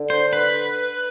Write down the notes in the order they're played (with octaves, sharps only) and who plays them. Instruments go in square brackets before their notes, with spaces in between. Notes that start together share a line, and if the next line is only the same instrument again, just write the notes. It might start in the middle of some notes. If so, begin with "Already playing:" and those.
Already playing: [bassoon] D3
[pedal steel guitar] C5
B4